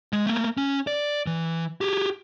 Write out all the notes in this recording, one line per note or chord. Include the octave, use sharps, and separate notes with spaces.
G#3
A3 A#3
C#4
D5
E3
G4 G#4